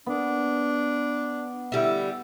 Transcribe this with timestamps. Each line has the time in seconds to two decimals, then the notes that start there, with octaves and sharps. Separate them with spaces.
0.06 B3 D4
1.72 D3 G3 E4